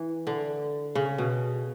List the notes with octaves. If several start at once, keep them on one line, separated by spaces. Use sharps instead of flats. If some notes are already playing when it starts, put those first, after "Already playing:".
Already playing: E3
D3
C#3
B2